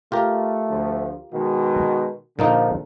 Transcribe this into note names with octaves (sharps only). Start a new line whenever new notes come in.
A3 F4 G4 A#4
D2 D3 F3
B2 D#3 G#3 F#4
A#1 A#2 D3 F3 A#3 D#4